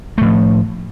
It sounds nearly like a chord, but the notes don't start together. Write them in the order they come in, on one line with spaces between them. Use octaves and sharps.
A3 A2 F3